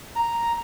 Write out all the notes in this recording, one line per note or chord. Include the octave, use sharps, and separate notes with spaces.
A#5